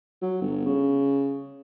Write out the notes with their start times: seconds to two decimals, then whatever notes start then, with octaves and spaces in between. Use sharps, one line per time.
0.22 F#3
0.41 G1
0.66 C#3